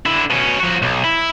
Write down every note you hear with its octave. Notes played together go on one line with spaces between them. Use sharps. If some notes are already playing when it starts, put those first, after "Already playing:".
D3 E4
B2 C#4
F3 F#4
B1
E4